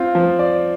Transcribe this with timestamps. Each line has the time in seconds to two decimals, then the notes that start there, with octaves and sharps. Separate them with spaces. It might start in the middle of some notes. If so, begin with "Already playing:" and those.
Already playing: C4 F4
0.15 F3
0.39 D5